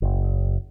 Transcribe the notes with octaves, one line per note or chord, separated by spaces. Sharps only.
F#1